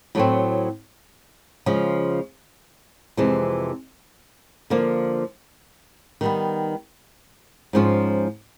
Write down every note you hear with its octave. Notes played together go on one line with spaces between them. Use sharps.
A2 F#3 A3 C4
C#3 F3 G#3
F2 C3 E3 G#3
D3 F3 A#3
D#3 G3 B3
G#2 F3 G#3 C#4 F4